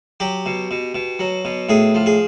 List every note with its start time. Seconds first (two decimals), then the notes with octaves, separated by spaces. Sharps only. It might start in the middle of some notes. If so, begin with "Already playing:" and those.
0.20 F#3 G4
0.46 B2
0.71 B2
0.95 B2
1.19 F#3
1.45 B2
1.69 A2 G#4
1.95 F3
2.06 G#4